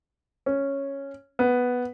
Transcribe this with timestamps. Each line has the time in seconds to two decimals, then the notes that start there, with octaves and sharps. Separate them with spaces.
0.46 C#4
1.39 B3